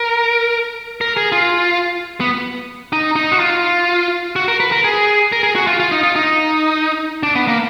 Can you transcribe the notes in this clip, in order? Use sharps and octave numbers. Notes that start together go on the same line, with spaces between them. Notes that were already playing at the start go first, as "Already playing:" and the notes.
Already playing: A#4
A#4
G#4
F4
B3
D#4
D#4
F#4
F4
F#4
A#4
B4
A#4
G#4
A#4
G#4
F#4
F4
F4
D#4
F4
D#4
D4
B3
A#3